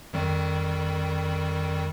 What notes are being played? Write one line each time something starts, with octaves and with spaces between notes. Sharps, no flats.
F2 D#3 G3